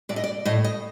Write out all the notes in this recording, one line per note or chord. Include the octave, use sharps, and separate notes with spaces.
A2 D5
D#5
D5
A2 D#5
D#5